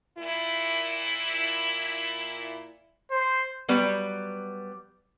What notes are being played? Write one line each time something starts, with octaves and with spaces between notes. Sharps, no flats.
A#2 E4
C5
F#3 G3 B3 B4 D5